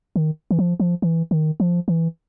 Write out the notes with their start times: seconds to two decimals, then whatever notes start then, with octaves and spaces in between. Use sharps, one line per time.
0.16 D#3
0.51 E3
0.59 F3
0.80 F3
1.02 E3
1.31 D#3
1.60 F3
1.88 E3